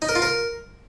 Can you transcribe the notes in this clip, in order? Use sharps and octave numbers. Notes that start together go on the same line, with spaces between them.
D#4
A#4
F4
A#4